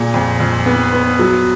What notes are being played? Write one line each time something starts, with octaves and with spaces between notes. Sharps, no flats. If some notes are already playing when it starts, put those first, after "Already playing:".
Already playing: A#2 G#4
F2
F2
B3
B3
F#3